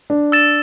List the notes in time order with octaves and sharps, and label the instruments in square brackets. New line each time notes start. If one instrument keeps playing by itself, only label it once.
[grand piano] D4
[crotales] E6 A6 E7